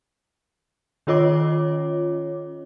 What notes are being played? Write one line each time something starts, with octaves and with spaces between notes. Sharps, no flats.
D#3 C#4 F4 C#5 D#5 D6